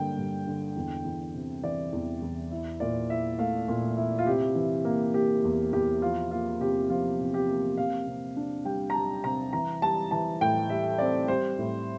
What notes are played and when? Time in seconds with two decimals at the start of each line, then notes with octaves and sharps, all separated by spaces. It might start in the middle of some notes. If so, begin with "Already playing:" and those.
Already playing: G2 D3 A#3 G5
0.18 G2
0.47 D3
0.76 E2
1.05 E2
1.34 C3
1.63 E3 D5
1.93 E2
2.22 E2
2.51 E4
2.80 A#2 D5
3.10 E4 E5
3.39 A3 F5
3.68 A#2
3.97 E4
4.18 F4
4.27 C3 G4
4.55 E3
4.85 A#3
5.14 A#3 G4
5.44 E2
5.72 E2 G4
6.02 F3 F4
6.31 A#3 F4
6.60 C3 G4
6.89 F3 F4
7.19 C3
7.34 G4
7.48 A#3
7.77 C3 F5
8.07 C3
8.36 D4
8.65 G3 G5
8.90 A#5
8.94 G3 A5
9.24 C3 A#5
9.53 E3 A#5
9.82 G3 A5
10.11 E3 A5
10.41 A2 G5
10.70 G3 E5
10.99 C4 D5
11.28 G3 C5
11.58 A2